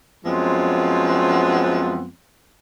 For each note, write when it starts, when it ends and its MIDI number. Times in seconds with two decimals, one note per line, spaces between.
0.25 2.08 42
0.25 2.08 53
0.25 2.08 56
0.25 2.08 59
0.25 2.08 60